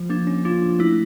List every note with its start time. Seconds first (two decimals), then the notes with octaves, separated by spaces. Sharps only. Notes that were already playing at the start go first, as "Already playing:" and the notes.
Already playing: F3
0.10 A#3 D4
0.27 C#4
0.45 D4 F4
0.62 F3
0.79 A3 E4